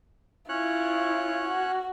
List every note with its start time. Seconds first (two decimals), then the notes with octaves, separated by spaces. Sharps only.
0.49 C#4 E4 F4 C#5 F#6
1.48 F#4